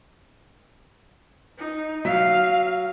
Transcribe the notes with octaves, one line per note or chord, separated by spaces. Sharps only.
D#4
F#3 F5